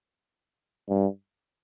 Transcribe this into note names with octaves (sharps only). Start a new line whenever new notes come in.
G2